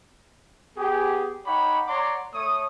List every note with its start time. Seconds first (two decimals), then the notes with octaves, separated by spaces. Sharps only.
0.77 B3 G4 G#4
1.46 D#4 C#5 F#5 G5 B5 D6
1.87 C#5 D5 F#5 A#5 C6 D6
2.34 A3 C#5 D#6